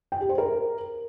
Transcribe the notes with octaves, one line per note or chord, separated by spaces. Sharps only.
G5
G4
C5
A#4